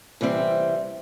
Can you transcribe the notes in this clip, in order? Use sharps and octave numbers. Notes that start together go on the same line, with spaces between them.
C3 E3 G3 C4 E5